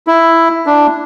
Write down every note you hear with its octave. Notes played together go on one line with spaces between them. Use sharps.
E4
D4